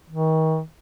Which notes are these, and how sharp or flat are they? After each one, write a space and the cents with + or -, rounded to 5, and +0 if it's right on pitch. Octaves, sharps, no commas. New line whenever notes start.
D#3 +35